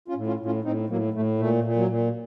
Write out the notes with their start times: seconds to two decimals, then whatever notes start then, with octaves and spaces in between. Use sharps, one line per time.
0.08 C#4 F4
0.15 A2
0.27 C#4 F4
0.39 A2
0.46 C#4 F4
0.64 A2 C4 D#4
0.90 A2 F#3 A#3
1.14 A2 A3
1.38 A#2 A3
1.64 A#2
1.76 F#3
1.88 A#2